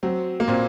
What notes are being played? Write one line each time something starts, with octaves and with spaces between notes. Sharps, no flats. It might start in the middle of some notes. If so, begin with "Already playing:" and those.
F#3 C4
A#3
A#2 C4